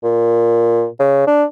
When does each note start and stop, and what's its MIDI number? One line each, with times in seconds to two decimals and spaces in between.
0.04 0.86 46
1.00 1.25 49
1.27 1.44 62